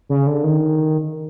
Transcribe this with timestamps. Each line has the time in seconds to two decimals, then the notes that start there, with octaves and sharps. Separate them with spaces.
0.09 C#3
0.27 D3
0.44 D#3